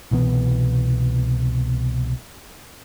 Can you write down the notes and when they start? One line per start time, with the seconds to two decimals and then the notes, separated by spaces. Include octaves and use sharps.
0.11 C2 B2 E3 B3